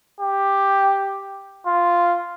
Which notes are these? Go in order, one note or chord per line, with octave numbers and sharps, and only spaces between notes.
G4
F4